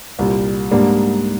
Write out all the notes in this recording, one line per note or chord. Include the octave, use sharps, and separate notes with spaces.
C2 A#2 G3
G#2 G3 A#3 D4